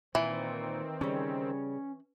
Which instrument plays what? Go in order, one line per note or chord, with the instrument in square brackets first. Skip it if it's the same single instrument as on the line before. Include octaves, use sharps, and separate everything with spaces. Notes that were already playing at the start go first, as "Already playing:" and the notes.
[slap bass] A#2 [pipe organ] D#3 C4 [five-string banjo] E3
[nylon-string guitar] C#3 G3 [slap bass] C#4